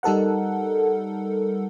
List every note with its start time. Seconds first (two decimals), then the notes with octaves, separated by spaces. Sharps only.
0.03 G3 D#4 A4 A#4 F#5